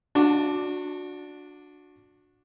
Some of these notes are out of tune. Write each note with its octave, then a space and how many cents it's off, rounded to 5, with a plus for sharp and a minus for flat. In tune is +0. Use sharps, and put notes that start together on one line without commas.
D4 +0 F#4 -25 A5 +40